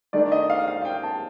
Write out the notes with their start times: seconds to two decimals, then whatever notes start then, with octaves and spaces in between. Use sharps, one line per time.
0.13 D#3 A3 D4 D5
0.32 D#5
0.50 F5
0.68 F5
0.82 F5
0.85 G5
1.03 A5